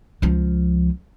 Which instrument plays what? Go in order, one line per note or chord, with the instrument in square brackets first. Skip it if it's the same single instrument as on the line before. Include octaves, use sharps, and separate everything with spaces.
[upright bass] C#2 F3